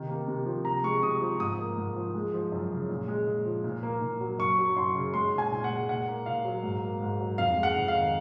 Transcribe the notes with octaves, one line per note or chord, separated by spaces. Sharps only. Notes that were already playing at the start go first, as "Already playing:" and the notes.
Already playing: C3 D#3
A#3
C3
F3
C3 A#5
G#3 C#6
C3 D#6
F3
G#2 D#6
A#3
G#2
F3
G#3
F3
F#2
C#3
A#2
G#3
A#2
F3
A#2
A#3
A#2
F#3
F#2 C#6
F#3
F#2 C6
C#3
G#3 C6
A#2
G#5
A#2
F#5
G#3
A#2 F#5
A#3
A#2 F5
F#3
G#2
A#3
G#2
F#3
F2 F5
G#3
F#5
F2
F5
D#3